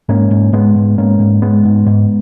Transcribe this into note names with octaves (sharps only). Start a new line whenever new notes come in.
G#2 A#3 C#4
G#2
G#2 G#3 B3
G#2
G#2 A#3 C#4
G#2
G#2 G#3 B3
G#2
G#2